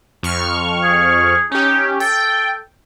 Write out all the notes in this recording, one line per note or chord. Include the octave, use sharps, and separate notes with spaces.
F2 C#6 F6
G#4
C#4 D#4 G4
A4 G5